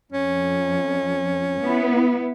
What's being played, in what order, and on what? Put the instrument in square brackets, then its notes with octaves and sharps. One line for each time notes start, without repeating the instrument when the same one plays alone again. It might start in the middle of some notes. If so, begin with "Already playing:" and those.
[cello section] F2 [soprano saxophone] C#4
[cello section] B3 E4